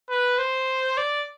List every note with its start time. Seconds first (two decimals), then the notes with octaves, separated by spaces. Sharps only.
0.10 B4
0.39 C5
0.98 D5